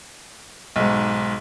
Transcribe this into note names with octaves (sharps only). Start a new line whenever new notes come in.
B1 G#2